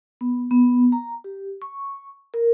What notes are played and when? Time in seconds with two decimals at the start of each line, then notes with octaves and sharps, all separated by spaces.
0.21 B3
0.51 B3
0.92 A#5
1.24 G4
1.62 C#6
2.34 A#4